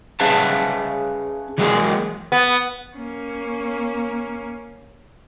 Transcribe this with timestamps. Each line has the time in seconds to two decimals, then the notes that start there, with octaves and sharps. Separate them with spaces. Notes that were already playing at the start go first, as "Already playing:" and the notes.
0.20 C#4 G#4 B4 E5 F5 A5
1.58 E3 F#3 G#3 A#3 G#4
2.32 B3
2.96 A#3 C#4